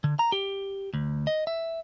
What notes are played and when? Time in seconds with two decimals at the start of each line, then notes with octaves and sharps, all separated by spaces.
0.04 D3
0.19 A#5
0.32 G4
0.94 D2
1.27 D#5
1.47 E5